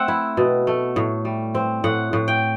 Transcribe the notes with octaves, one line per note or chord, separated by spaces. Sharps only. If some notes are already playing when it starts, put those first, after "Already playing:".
Already playing: A3 C4 E5 F#5
E4
B2
A3
A2
G3
C4
A2 F#5
A2
G5